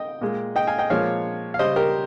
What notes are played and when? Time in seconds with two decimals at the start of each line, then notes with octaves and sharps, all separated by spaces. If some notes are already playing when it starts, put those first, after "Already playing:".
Already playing: D#5 G5
0.21 A#2 G#3
0.56 D#5 G5
0.67 F5 G#5
0.79 D#5 G5
0.90 A#2 F3 G#3 C#5 F5
1.54 F5
1.59 C#3 G3 C5 D#5
1.76 G4 A#4